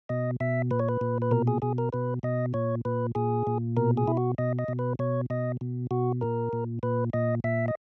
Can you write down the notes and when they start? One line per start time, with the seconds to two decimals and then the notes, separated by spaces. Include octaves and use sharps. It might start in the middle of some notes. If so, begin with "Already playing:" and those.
0.09 B2 D#5
0.40 B2 E5
0.71 A#2 B4
0.79 C#5
0.89 B4
1.01 A#2
1.22 B4
1.31 B2 A#4
1.47 G#4
1.62 B2 G#4
1.78 A#4
1.93 B2 B4
2.23 B2 D#5
2.54 A#2 C#5
2.85 A#2 B4
3.15 A#2 G#4
3.47 A#2
3.77 B2 A#4
3.97 G#4
4.07 B2 E4
4.17 F#4
4.38 B2 D#5
4.59 D#5
4.68 B2
4.79 B4
4.99 B2 C#5
5.30 B2 D#5
5.61 B2
5.91 B2 F#4
6.21 A#2 A#4
6.53 A#2
6.83 A#2 B4
7.13 A#2 D#5
7.44 A#2 E5
7.68 D#5